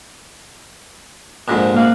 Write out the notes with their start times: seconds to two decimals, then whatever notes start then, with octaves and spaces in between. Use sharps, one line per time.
1.48 A#1 F2 G#2
1.74 A#3 F5 F#5